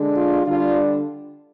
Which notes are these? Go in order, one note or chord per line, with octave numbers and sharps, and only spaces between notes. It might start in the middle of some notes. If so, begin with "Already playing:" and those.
Already playing: D3 G#3 D4
F4
D3 G3 D4 F4